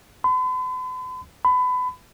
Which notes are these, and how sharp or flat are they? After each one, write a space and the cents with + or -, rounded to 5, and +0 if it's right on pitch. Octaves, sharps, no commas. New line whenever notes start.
B5 +45
B5 +25